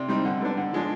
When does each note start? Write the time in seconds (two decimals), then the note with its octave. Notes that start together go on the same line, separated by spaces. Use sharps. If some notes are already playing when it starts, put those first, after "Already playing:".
Already playing: C3 D5
0.08 G3 C4 D#4
0.25 D3
0.41 G3 B3 D4
0.57 D3
0.73 F3 G#3 D4